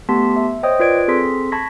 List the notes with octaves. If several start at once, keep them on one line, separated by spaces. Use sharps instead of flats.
A3 B3 G4 A5 C6 B6
E5
C5 C#5 D#5 G5 D#6
F4 B4 D5 G#6 D7
C4 G#4 A4 C6 B6
A5 B5 C#6 G#6 A#6 B6